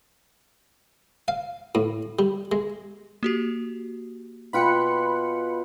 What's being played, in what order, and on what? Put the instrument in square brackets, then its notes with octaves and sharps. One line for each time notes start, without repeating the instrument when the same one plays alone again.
[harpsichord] F5
A2
G3
G#3
[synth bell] A#3 F#4 G4
[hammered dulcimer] B2 F4 G5 [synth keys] B5 F#6 C#7